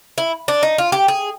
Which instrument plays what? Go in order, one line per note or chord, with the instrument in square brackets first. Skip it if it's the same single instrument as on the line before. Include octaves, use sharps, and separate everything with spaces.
[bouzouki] E4
D4
D#4
F4
G4
G#4